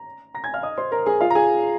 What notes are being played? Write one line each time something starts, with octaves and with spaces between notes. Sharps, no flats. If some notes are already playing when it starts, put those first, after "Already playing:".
Already playing: A#5
A#5 A#6
G#5 G#6
F5 F6
D#5 D#6
C5 C6
A#4 A#5
G#4 G#5
F4 F5
A#5
G#4 G#5